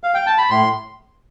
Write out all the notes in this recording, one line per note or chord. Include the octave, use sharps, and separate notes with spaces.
F5
G5
A5
B5
A2 C6